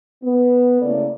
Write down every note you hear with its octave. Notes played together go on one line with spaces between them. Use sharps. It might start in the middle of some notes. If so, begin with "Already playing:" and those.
B3
C#3 A3 A#3 E4 A4 D5